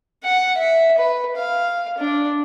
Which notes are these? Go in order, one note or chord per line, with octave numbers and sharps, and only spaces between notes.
F#5
E5
B4
F5
D4